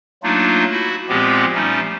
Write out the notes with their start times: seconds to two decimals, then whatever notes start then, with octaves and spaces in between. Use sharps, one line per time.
0.23 F#3 A3 A#3 D4 D#4 F4
0.71 E4 F#4
1.09 A#2 F3 G#3 B3 C4 G4
1.55 F3 G3 A3 C#4 D#4